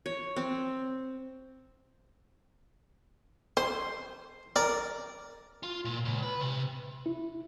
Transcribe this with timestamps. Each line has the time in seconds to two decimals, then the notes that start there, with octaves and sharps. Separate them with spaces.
0.06 C#5
0.36 C4
3.57 C5 C6
4.56 A#4 D5
5.63 F4
5.85 A#2
6.05 C#2
6.23 B4
6.41 C3
7.06 E4